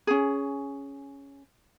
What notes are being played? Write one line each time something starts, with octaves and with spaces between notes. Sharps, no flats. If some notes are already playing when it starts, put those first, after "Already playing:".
C#4 G#4